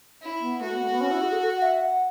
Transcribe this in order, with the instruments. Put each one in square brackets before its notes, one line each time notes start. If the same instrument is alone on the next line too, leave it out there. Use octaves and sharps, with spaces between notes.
[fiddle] E4
[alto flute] B3
[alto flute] A3 [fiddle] F#4
[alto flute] B3
A3
B3
C#4
E4
G#4
A4
F#5
E5
F#5